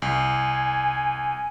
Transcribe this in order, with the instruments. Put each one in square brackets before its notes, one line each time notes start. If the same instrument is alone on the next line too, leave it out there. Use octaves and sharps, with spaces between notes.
[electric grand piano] C2 [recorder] G#5